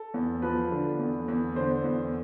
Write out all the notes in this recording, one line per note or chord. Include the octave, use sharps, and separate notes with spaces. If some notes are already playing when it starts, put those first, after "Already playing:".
Already playing: A4
E2
F3 B4
D3
E2
E2
D3 C5
E2